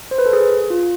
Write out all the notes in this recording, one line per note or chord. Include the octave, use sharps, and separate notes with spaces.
C5
B4
A4
G#4
F4